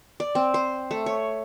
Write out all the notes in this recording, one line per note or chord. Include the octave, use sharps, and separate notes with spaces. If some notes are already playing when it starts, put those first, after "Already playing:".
D5
C4
C5
A3
C#5